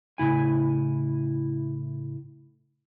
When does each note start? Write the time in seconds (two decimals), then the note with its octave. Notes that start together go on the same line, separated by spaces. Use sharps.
0.18 A2 C#3 E4 G#5